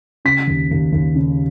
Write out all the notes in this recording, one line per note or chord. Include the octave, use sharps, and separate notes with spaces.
C#3 B6
D#2
D#2
D#2
C#3